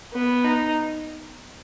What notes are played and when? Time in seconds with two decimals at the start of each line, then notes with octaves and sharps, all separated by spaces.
0.14 B3
0.45 D#4